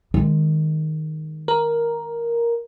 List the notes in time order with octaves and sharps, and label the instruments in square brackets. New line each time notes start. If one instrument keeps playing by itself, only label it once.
[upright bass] D#3 G#3
[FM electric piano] A#4